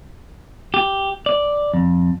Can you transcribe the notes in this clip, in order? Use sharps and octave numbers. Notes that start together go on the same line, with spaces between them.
G4
D5
F2